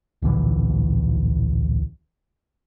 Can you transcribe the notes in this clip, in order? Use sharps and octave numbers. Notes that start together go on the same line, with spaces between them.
D1 A#1 D3 E3